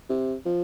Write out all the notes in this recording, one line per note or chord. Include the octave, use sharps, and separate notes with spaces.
C3
F3